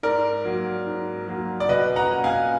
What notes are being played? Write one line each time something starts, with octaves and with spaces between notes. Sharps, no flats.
G#2 A#4 D5
F#3 A#3
G#2
F#3 A#3
D5
B2 B4 D#5
F#5 A#5
A#3
F5 G#5